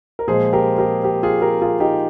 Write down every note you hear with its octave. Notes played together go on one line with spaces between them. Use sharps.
A#4
A#2 F3 G#3 G#4 C5
G4 A#4
G4 A#4
G4 A#4
F4 G#4
G4 A#4
F4 G#4
D#4 G4